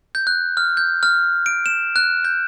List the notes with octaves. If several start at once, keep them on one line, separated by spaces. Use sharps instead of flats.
G6
F#6
F6
G6
F6
D7
E7
F#6
G6